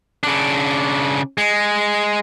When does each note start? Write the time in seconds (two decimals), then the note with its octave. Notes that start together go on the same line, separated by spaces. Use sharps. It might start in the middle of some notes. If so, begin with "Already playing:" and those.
0.23 C#3 D4
1.38 G#3